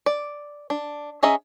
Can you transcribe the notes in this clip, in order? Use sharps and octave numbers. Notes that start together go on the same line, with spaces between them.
D5
D4
C#4 G#4 D#5 E5 A#5